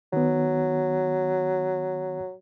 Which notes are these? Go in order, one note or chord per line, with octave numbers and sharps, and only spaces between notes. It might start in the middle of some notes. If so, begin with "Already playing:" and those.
D#3 F#3 B3